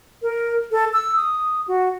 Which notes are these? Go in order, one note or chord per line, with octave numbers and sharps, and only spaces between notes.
A#4
A4
E6
D#6
F#4